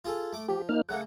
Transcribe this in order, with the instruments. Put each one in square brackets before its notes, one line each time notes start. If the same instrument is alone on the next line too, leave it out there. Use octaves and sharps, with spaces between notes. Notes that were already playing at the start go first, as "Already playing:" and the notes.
[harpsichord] F4 G#4 A4
A3 D6
[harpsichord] F3 [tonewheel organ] G4
[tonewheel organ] A#3 D#4 F6
[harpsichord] C#3 A3 A#3 [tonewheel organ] F#5